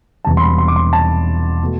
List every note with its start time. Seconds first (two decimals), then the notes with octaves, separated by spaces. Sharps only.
0.25 E1 E2 C3 G3 A5
0.37 C6
0.41 B5
0.58 C6
0.68 D6
0.76 C6
0.93 A5
1.63 B2 A3